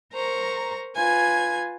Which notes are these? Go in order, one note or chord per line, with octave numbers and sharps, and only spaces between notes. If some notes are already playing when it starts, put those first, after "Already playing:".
A#4 C5 A#5 C#6
F4 B4 G#5 G#6